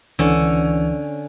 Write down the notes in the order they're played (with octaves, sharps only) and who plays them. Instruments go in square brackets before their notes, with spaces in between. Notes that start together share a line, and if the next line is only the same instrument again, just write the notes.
[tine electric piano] C#2 E3 [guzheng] D3 C#4